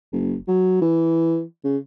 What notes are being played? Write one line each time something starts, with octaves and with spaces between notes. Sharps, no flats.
F#1
F#3
E3
C#3